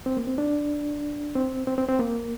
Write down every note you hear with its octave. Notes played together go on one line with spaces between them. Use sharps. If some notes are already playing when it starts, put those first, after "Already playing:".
C4
A#3
C4
D4
C4
C4
C4
C4
A#3